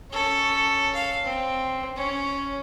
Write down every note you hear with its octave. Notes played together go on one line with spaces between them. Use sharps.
C#4 A4
F5
C4
C#4